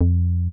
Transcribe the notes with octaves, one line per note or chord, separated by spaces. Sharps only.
F2